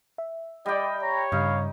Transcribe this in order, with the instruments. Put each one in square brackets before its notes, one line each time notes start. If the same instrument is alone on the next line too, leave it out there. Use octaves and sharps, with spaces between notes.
[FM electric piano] E5
[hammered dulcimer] G3 G5 [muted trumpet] D5 [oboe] D#5
[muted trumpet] C#5 [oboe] A#5
[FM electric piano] G2 C#3 G3 [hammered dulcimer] D#4 [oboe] F5